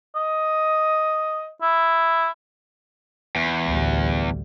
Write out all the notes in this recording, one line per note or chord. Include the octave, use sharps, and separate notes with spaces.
D#5
E4
E2
A1 D2 G3